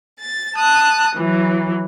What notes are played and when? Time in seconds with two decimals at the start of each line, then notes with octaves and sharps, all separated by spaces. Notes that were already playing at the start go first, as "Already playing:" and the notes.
0.20 A6
0.56 A5 D#6 F#6
1.14 E3 F#3